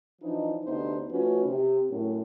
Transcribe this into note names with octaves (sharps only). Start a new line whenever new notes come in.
E3 F3 D4 D#4
D2 C3 B3 D4 D#4 C5
F3 A3 C#4 D#4 F#4 B4
C3
F#2 A2 C#4